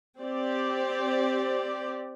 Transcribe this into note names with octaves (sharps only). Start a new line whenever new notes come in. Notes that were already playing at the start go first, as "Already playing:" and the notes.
C4 G4 D5